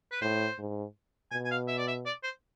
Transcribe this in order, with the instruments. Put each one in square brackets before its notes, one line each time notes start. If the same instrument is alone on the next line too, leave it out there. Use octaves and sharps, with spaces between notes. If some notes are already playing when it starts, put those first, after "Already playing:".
[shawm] B4
[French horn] A2 [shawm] C5
[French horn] G#2
[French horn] B2 [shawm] G#5
[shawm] G#5
F5
E5
D5
E5
D5
C5